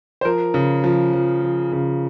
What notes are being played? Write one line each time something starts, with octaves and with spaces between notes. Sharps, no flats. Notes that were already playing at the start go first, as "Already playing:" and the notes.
C5
F3 A#4
C#3
F3
F3
F3
C#3